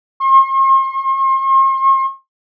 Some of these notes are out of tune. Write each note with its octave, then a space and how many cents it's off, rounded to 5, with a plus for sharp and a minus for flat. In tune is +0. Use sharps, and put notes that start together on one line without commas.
C6 +45